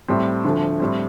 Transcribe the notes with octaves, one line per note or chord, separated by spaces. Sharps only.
A2 G3 C4
D2 D3 F3 A3
A2 G3 C4